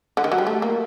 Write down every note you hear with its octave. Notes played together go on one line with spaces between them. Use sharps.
D3
D#3
F#3
G3
A3
A#3